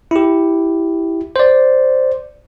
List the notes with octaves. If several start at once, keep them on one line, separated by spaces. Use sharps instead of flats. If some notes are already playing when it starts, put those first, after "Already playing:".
E4 G4
C5 D5